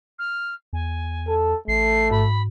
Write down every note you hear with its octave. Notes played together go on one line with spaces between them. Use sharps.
F6
E2 G#5
A4
A1 A3 C7
G#2 B5